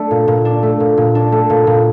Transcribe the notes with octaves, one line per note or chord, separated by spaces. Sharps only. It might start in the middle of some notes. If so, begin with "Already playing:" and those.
Already playing: A3 D4
A#2
A#2
D4
A3
A#2
A#2
D4
A3
A#2
A#2